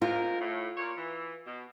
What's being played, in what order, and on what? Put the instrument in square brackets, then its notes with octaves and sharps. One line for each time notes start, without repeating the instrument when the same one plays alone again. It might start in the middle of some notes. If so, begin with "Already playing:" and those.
[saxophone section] G#2 D3 A#4 [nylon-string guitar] F4
[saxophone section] A2
A#2 C#5
E3
B2